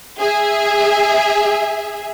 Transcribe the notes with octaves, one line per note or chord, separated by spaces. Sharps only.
G#4 E5